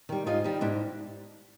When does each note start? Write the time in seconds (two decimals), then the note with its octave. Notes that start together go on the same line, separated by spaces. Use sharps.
0.09 D#3 G3
0.26 G#2 D#4 F4
0.44 D#3 G3
0.61 G#2 D4 E4